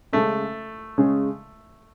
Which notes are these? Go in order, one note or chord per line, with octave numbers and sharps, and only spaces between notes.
C#3 G#3 A3 C#4
C#3 G#3 C#4 G#4